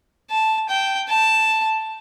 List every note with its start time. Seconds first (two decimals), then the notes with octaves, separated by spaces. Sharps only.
0.31 A5
0.70 G5
1.09 A5